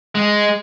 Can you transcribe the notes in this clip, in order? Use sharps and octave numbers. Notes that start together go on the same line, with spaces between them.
G#3